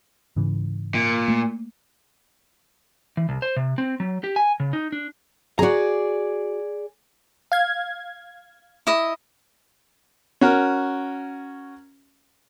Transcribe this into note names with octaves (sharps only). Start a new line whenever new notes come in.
G#2 C#3 E3
A#2
A3 A#3
E3
C2
C5
C3
C4
F#3
G4
G#5
C#3
D#4
D4
F#4 G#4 D5 A#5
F5 G#6
E4 D#5
C#4 F#4 A#4